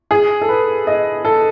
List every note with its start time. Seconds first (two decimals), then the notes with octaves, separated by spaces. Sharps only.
0.11 G#4
0.42 A4
0.49 B4
0.87 D#5
1.25 A4